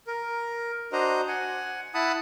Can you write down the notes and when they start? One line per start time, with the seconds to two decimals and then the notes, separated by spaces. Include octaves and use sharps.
0.07 A#4
0.92 D4 F#4 C5 D#5 A#5
1.28 F#5 G#5
1.94 E4 F#5 A5 B5 D#6